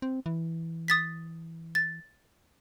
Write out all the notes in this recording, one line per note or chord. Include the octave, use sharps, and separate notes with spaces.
C4
E3
D#6 A6 B6
A6